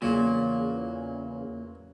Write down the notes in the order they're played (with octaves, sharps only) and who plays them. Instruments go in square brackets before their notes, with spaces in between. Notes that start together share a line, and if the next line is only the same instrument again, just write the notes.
[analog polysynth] E2 C#3 [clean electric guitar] A#2 [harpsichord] F#3 A#3